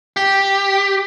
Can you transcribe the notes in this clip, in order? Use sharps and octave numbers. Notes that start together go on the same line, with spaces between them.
G4